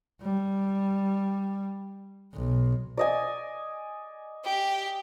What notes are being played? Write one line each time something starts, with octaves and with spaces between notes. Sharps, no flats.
G3
B1
D5 D#5 G#5
G4